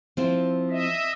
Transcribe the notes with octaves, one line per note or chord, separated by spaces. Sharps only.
F3 C4 E4
D#5 E5